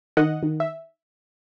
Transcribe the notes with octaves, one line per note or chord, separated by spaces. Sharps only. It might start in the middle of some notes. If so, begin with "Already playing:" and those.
D#3 D#5 F#5
D#3
E5